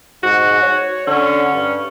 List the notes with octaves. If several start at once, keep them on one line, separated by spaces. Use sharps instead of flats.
G#2 F#4
C#5
D3 C#4
G2